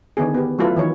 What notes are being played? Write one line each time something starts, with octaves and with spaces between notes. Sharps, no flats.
D3 D#3 B3 G#4
B3 G4
F#3 A3 E4 F4 A4 B4
D#3 E3 C#5